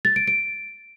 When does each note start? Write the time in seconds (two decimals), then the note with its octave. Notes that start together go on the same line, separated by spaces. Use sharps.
0.05 A6
0.16 D7
0.28 D7